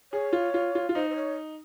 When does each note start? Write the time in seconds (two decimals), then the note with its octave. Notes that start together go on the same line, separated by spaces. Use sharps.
0.12 G#4 C#5
0.33 F4
0.54 F4
0.75 F4
0.89 F4
0.95 D#4 C5
1.10 C5
1.16 C#5